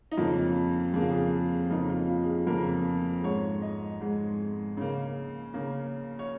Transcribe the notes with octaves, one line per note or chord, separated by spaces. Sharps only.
D#4
F2 C#3 A#3 F4
F2 C#3 A#3 G#4
F4
G#4
F2 C#3 A#3 D#4
G#4
F4
F4
G#4
F4
F2 C#3 A#3 A#4
G#2 G#3 C#5
D#5
G#2 G#3
C#3 A#3
C#3 A#3
C#5